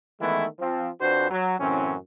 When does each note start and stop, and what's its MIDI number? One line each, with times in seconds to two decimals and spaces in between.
0.20 0.46 51
0.20 0.46 52
0.20 0.46 56
0.20 0.46 57
0.20 0.46 59
0.20 0.46 64
0.59 0.89 53
0.59 0.89 60
1.01 1.30 41
1.01 1.30 62
1.01 1.30 66
1.01 1.30 71
1.01 1.30 72
1.31 1.58 54
1.60 1.95 42
1.60 1.95 45
1.60 1.95 52
1.60 1.95 60
1.60 1.95 61